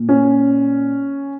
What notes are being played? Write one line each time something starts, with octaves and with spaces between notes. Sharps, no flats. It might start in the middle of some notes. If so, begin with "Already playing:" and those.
Already playing: A#2
C#4